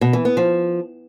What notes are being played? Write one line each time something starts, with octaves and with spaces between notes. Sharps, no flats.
B2
E3
B3
F3